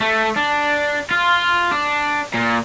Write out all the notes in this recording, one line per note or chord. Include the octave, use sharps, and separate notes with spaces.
A3
D4
F4
D4
A#2